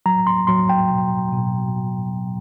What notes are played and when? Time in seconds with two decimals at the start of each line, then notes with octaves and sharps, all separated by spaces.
0.06 F#3 A#5
0.27 C6
0.47 F#3 C6
0.69 G5
0.90 B2
1.33 B2